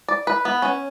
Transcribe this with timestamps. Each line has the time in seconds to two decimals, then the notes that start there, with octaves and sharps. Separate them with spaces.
0.08 D5
0.27 B4
0.45 B3
0.62 C#4